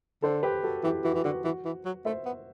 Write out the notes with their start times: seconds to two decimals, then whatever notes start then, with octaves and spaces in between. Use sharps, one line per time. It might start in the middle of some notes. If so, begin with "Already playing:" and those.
0.22 D3 A4 C5
0.43 G4 B4
0.63 F#4 A4
0.83 E3 E4 G4
1.04 E3 F#4
1.14 E3
1.24 D3 F#4
1.44 E3 F#4
1.65 E3
1.85 F#3
2.05 A3 C5 E5
2.25 B3